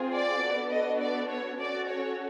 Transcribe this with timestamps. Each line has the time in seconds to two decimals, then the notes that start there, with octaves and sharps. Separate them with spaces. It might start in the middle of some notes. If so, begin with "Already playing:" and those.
Already playing: C4 F4 G#4
0.12 D5
0.42 B3 D4 F#4 A4
0.70 D#5
1.00 D5
1.29 C#5
1.59 C#4 F#4 A4 D5
1.88 C#5